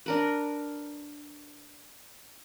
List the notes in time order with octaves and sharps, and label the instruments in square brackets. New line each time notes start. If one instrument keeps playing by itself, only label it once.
[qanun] D4 A#4 B4